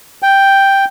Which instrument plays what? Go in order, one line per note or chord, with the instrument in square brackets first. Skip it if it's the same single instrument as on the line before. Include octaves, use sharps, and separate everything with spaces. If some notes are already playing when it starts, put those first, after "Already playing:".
[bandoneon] G5